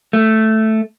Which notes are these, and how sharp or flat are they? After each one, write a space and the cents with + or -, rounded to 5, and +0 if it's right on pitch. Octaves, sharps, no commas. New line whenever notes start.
A3 +0